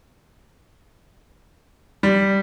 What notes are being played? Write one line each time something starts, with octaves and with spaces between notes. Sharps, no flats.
G3